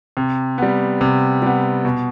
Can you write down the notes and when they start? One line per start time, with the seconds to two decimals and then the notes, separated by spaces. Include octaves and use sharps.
0.17 C3
0.58 G3 B3
1.01 C3
1.42 G3 B3
1.85 B2